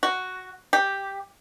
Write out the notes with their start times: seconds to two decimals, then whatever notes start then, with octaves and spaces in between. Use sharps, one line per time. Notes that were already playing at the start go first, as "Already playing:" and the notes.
0.03 F#4
0.73 G4